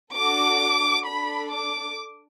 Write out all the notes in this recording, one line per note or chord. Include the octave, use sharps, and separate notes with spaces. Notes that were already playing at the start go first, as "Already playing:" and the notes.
D4 F#4 A4 D6
D4 A4 B5
D6